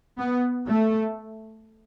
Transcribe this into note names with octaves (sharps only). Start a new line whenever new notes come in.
B3
A3